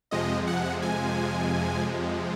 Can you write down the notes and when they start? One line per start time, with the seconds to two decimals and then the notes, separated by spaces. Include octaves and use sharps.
0.11 F2 C3 F3 G#3 D#5
0.47 F#5
0.82 G#5